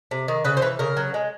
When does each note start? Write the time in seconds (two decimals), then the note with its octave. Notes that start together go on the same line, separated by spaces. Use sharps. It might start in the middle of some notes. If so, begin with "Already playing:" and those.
0.11 C3
0.28 D#3
0.44 C#3 B4
0.57 C5
0.62 E3 B4
0.79 C#3 A#4
0.97 F#3
1.14 G#3